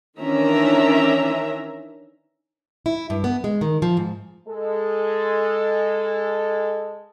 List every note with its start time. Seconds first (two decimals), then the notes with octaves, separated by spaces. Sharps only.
0.19 D#3 E3 C#4 D4 E5 A#5
2.86 E4
3.10 G2
3.24 B3
3.44 G#3
3.61 D#3
3.82 F3
3.97 G#2
4.48 G#3 A4